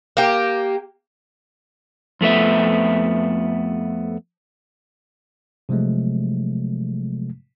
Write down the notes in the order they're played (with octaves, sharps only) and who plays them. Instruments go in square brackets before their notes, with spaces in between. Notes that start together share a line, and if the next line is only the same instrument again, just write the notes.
[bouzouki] A#3 G4
[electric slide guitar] F2 A3 B3 E5
[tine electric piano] C3 F3 F#3 G#3 A3